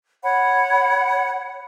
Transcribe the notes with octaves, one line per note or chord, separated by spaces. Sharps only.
C#5 F#5 B5